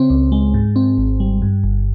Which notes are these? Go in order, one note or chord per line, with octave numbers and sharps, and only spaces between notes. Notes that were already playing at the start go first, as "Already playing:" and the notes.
Already playing: C#3 C4
C#2
G#3
G#2
C4
G#1
G3
G2
G1